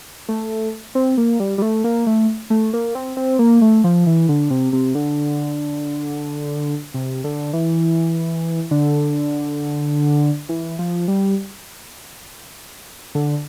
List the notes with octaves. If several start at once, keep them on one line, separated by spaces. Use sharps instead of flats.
A3
C4
A#3
G3
G3
A3
A#3
A3
A3
A#3
C4
C4
A#3
A3
F3
E3
D3
C3
C3
D3
C3
D3
E3
D3
E3
F3
G3
D3